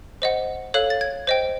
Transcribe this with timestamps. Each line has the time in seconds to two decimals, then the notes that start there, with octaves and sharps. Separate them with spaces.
0.22 C5 D#5 F#5
0.74 A4 C#5 F5 F#6
0.90 A6
1.01 G#6
1.27 C5 D#5 G5